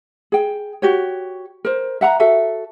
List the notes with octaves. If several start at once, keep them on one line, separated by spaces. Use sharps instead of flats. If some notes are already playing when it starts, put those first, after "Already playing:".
G#4 G5
F#4 G4 C#5
A#4 C5
E5 F#5 A5 A#5
F#4 A4 E5